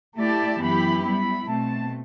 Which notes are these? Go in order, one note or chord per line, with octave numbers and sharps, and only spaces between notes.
A3 E4 G4 D5 A5
F#2 E3 B3 E4 G4 B5
G3 B3 E4 B5
B2 A3 C4 A5